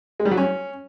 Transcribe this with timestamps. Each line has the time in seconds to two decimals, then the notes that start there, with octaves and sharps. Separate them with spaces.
0.20 G#3
0.25 G3
0.31 F#3
0.37 C#4